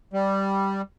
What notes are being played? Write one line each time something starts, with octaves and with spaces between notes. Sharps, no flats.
G3